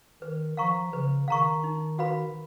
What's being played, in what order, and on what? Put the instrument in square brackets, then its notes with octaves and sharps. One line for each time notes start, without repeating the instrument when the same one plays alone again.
[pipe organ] D#3 [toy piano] B4
[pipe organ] F3 [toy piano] F5 A#5 C#6
[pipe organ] C#3 [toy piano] B4
[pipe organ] D#3 [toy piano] F5 A#5 C#6
[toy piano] D#4
F#4 B4 F5 B5